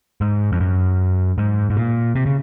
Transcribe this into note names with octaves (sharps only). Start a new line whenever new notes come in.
G#2
F2
F#2
G#2
G#2
A#2
C3
C#3